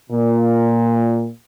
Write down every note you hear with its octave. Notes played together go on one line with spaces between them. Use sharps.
A#2